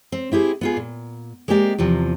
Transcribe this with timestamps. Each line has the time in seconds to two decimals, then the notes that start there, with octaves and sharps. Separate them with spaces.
0.12 C4
0.32 C4 E4 G4 G#4
0.61 B3 F4 G#4
0.77 A#2
1.48 G#3 A#3 C4 G4 D5
1.78 E2 C3 F3